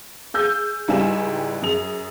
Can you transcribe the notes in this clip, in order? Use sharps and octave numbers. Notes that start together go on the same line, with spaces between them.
G#4 E6 G6
C#2 G#2 G3 E4 G#5 E7
F#2 G#4 F7